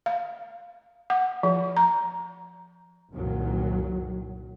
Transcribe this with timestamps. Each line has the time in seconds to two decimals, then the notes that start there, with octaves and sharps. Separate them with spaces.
0.06 F5
1.10 F#5
1.43 F3
1.77 A#5
3.12 F#1 C2 A#2 D#3 F#3